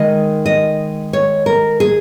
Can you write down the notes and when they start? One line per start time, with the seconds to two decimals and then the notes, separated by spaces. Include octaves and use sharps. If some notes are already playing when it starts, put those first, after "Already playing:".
Already playing: D#3 G#3 D#4 D#5
0.46 D#5
1.13 C#5
1.46 A#4
1.80 G#4